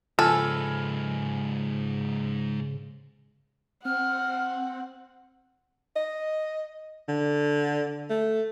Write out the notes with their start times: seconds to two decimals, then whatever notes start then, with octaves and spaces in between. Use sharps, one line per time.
0.19 G#2 C#3 F3 A4 B4 G#5 F6
3.85 C4 F#5 F6
5.96 D#5
7.08 D3
8.10 A3